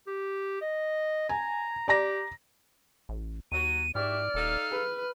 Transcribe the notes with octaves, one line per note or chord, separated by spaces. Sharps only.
G4
D#5
G#5 A#5
G4 D5 A#5 A#6
A1
D#2 F#3 D#7
G#2 F#4 G4 D5 E5 F6
D#1 D#4 A4 F5
G#4 B4